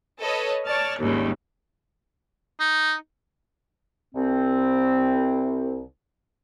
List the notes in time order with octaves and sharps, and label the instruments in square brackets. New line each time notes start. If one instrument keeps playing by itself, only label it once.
[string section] A4 B4 C#5 D#5
C#5 D5 A5 F6
G#1 D#2 A#2 C#3 G3
[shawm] D#4
[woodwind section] C2 C4